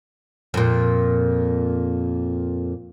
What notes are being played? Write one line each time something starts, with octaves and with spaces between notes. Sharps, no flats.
F2 A#2